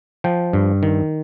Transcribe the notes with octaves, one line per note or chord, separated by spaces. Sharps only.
F3 G5
G2
D#3